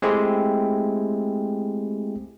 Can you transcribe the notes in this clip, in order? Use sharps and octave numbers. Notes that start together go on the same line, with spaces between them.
G#3 A3 C4 E4 G4 G#4